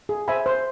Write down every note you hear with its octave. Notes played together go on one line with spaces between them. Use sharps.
G#4
C5 E5 G#5 B5
C5